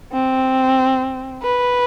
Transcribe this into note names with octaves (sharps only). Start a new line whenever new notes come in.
C4
B4